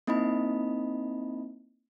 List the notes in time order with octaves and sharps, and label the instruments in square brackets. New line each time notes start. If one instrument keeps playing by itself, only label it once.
[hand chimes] A#3 C4 D#4 E4 D#5 B5